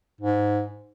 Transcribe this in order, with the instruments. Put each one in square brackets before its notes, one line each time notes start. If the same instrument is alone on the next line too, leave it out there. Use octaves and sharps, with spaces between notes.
[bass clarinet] G#2